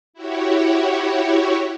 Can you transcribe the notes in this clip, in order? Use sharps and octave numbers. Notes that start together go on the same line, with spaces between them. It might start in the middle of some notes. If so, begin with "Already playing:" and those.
E4 F#4 G4 C#5